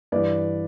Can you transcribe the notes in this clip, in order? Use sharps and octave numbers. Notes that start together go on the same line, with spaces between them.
G2 E3 B4 D5